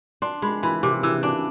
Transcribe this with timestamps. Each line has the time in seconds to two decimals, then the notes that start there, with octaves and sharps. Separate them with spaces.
0.22 D4 C6
0.42 G#3 B5
0.63 E3 B5
0.83 C3 D6
1.03 E3 E6
1.23 D4 D6